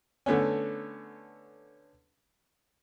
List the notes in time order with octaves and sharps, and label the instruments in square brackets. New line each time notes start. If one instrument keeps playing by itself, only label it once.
[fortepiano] D3 A3 B3 C#4